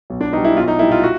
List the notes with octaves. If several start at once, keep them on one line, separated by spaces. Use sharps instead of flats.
B1
D4
B2 G3 D#4
E4
B1 F4
D#4
A#2 G3 E4
F4
F#4